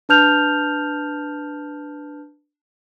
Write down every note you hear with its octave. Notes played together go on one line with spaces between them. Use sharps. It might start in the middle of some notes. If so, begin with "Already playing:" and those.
D4 B4 A5 F6 G6 F7